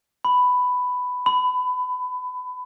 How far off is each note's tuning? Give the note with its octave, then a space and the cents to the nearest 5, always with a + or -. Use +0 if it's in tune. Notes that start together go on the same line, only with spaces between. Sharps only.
B5 +10
B5 +25